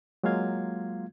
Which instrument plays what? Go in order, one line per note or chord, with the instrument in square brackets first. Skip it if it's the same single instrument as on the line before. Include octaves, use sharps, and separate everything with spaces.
[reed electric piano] F#3 G#3 A#3 F4 F5 G#6